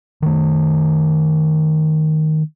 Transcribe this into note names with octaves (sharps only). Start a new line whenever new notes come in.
D#3 A3